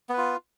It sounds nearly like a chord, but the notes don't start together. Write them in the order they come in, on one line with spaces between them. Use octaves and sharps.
B3 B4 F4